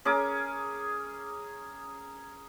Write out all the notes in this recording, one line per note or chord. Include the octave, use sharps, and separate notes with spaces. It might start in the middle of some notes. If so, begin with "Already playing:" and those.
C#4 G#4 A#4 D6